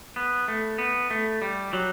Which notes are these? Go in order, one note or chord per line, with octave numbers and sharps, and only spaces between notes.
B3
A3
B3
A3
G3
F#3